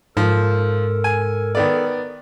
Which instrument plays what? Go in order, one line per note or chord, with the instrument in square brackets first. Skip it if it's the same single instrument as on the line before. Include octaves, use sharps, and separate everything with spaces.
[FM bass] G#2 [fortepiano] F3 [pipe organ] A4 A#4
[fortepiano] G#5
D#3 B3 D5